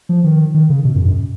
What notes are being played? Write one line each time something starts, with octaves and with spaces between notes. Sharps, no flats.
F3
D#3
D#3
C#3
B2
F#2
F#2